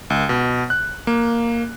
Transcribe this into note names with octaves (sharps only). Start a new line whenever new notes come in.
C#2
B2
F#6
A#3